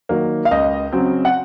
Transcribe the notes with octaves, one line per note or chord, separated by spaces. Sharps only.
D#3 F#3 A#3
F5
C#2 D#5
C#3 F#3 C4
F#5